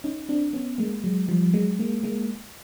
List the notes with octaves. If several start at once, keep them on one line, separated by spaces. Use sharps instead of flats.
C#4 D#4
C4 D4
B3 C#4
G#3 A#3
F#3 G#3
F3 G3
F#3 G#3
G#3 A#3
G#3 A#3